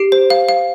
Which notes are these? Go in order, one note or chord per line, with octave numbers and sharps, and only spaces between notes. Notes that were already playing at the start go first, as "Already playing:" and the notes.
Already playing: G4 C7 D7
C5
F5
F5